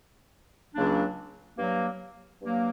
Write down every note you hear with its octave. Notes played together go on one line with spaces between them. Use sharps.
C#2 C#3 F#3 A#3 D4
G2 F#3 A#3
G2 F#3 A#3